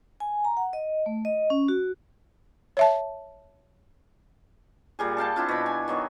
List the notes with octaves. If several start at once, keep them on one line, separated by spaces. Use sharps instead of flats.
G#5
A#5
F#5
D#5
A3
D#5
C#4
F#4
C#5 E5 A5
A#2 G3 G#4
A4 F5 G5 A5
C4 D4 E4 F4
B2 B5
G#5
D#3 F#3 B3